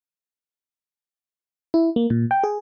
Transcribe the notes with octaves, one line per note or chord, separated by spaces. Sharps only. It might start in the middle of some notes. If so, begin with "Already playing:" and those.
E4
A#3
A#2
G5
G#4